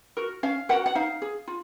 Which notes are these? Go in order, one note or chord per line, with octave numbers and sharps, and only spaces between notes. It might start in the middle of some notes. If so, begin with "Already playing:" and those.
F#4 A#4
C#4 F5
F#4 A#4 F#5
F#5
D#4 F5
G#4
F4